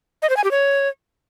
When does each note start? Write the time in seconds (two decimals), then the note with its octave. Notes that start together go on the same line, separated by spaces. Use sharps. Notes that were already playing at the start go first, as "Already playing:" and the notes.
0.22 D#5
0.29 C5
0.37 G#5
0.44 G4
0.51 C#5